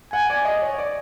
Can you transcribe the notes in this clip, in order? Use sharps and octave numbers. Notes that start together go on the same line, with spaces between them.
F#5 G#5
D5
D#5
C#5
D5